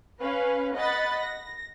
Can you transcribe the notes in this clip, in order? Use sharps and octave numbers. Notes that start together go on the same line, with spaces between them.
C#4 B4 F5
D#5 F#5 B5 F#6 A6
A#6